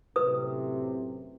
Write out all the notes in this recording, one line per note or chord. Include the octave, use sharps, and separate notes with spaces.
F#2 A2 C3 B4 D#6